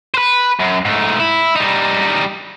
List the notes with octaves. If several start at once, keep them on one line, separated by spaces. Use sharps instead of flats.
B4 C5
F#2
G#2 A3
E4
G3 D#4